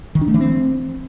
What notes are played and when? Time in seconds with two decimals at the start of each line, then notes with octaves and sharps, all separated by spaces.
0.15 D#3
0.21 D4
0.28 A3
0.34 E3
0.40 C4